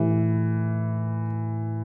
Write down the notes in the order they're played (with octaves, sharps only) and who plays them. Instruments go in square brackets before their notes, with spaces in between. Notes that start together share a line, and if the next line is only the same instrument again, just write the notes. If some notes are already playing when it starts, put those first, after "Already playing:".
Already playing: [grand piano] A2 A3 E4 G4 [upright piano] E3